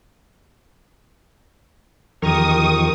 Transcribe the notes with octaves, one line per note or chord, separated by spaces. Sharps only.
E2 D#3 F3 G4 A#4 C#6 D#6